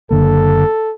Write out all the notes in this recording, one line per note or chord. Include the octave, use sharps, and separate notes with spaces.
F#1 D3 A#3 A4